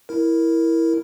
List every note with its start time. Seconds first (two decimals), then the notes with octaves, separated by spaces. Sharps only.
0.09 E4 A#4